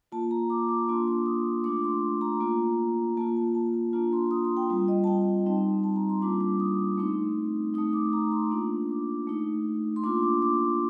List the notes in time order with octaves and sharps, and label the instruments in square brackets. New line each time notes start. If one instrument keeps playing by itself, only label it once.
[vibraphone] A#3 F4 A5
A#5
D6
D6
A#3 D4 F4 C6
D6
D#6
A3 D4 F4 D6
C6
A#5
A#3 F4
A#3 F4 A5
A5
A5
A5
A#3 D4 F4 A#5
C6
D#6
C6
G5
G3 C4 F4
D#5
A5
G5
G3 C4 D#4
A5
A#5
C6
G3 A#3 D4 F4 D6
D6
D#6
A3 C4 D#4
D#4 D#6
A3
D6
A#5
C6
A#3 D4 F4
D6
A3 D#4
C6
A#3 D4 F4 D6
D6
D6